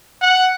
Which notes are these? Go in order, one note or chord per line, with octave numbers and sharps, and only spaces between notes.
F#5